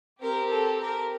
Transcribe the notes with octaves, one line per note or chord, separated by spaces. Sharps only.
C4 G4 A#4
A4
A#4